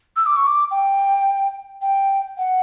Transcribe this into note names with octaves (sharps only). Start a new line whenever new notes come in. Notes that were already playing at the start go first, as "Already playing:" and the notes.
E6
D6
C#6
D6
G5
G5
F#5